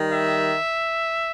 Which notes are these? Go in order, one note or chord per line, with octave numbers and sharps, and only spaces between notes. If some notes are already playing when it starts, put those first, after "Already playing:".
Already playing: D#3 G3
E5